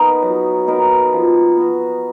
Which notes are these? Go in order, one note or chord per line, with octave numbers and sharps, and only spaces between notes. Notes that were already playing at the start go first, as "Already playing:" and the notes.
Already playing: B3 D#4 A#4
F#3
B3 D#4 A#4
F3
B3 F#4